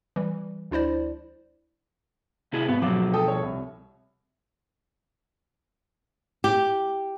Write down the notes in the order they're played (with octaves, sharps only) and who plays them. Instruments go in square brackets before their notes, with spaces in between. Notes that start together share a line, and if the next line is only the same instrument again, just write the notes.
[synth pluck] E3 G3
D2 D4 E4 C5 D5
[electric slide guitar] C3 E4 G#4
[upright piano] G#1 [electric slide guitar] B3
[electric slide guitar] B2 F3 [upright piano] F#3 D6
[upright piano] A4 G5 D#6
C#5
C2
[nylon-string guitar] G4